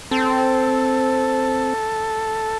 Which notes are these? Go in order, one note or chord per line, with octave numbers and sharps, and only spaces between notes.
C4 A4